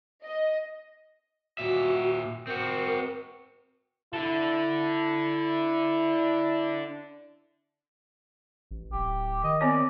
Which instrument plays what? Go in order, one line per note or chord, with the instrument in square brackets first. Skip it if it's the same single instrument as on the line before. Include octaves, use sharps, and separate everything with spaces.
[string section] D#5
[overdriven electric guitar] A#2 E5 [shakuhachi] F#4
[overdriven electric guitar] C4 F#4 [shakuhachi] A#4
[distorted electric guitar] D4 A4 [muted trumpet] E4
[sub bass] A1
[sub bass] D1 [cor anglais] G4
[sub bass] D#3 [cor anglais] D#5
[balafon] B3 C4 C#5 [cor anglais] D5